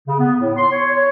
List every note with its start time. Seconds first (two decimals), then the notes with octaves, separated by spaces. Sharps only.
0.07 C#3
0.19 B3
0.40 A2
0.57 C6
0.72 C#5
0.92 C#5